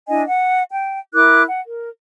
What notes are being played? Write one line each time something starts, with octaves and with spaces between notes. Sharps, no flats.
D4 E4 D#5 G#5
F#5
G5
E4 A#4 D6 F#6
F#5
A#4